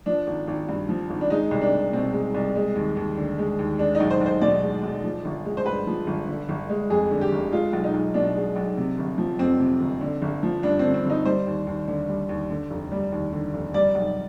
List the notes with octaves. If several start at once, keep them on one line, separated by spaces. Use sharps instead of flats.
F3 D4
G#1
G#1
G2
F3
G#1
D4
G#3 D#4
C2
D4
C2
B2 C4
G#3
C2
G#3
D#2
D#2
D3
G#3
D#2
G#3 D4
D#4
B1
C5
B1 C5
B2 D5
G#3
B1
F3
G1
G#3
C5
G2 B4
F3
G1
D3
G1
G#3
F2 G#4
D3
G4
G1
G#3 F4
B1
D#4
B1
B2 D4
G#3
B1
C3
G1
F3
F2 C4
C3
G1
D3
G1
F3
G2 D4
C4
D3
C4
G1 D#4
G3 C5
D#2
D#2
D3
G3
D#2
D3
F1
G3
D#2
D3
F1
G3 D5
B1